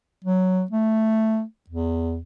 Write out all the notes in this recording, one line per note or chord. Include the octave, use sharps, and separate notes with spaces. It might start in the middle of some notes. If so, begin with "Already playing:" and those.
F#3
A3
E2